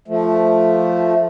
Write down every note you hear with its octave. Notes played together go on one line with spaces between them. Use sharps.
F3 A3